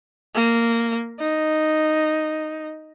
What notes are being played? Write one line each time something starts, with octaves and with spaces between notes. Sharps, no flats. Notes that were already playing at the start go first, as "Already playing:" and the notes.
A#3
D#4